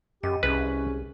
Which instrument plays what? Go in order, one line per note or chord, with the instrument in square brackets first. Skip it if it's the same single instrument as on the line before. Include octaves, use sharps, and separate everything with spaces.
[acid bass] F#2 [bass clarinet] G4 [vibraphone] D#5
[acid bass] C2 [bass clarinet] C#4 [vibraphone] G#4 [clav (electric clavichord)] B4